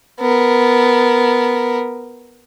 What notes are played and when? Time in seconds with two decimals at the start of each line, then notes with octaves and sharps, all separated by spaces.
0.20 B3 A#4